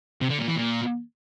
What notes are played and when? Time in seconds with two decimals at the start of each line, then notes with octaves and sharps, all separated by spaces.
0.21 C3
0.30 D3
0.39 A#2
0.47 E3
0.56 A#2